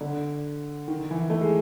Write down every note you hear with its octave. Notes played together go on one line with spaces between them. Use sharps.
D3
D#3
E3
A3
G#3